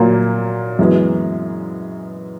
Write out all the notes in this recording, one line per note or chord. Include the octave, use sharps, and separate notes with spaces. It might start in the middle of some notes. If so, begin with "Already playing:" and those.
Already playing: A#2 F#3 A#3
F#2 E3 G#3 B3